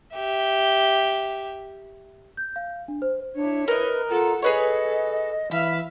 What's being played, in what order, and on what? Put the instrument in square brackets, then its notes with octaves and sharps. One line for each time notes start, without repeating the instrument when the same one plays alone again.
[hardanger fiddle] G4 E5
[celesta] G6
F5
D4
C5
[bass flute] D4 [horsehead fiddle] E4 C#5
[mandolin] A#4 D#5 [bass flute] B4
[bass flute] F4 [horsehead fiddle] A4 F#5
[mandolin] G#4 B4 C#5 [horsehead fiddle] A4 [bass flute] D#5
[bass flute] E3 [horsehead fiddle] E5 F5 [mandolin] B5